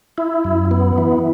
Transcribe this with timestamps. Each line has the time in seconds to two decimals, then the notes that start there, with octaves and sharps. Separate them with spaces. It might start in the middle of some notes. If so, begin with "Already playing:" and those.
0.18 E4
0.44 F#2
0.71 B3
0.98 E3